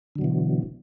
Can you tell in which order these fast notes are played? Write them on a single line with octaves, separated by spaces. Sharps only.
D3 F#3 B2 E3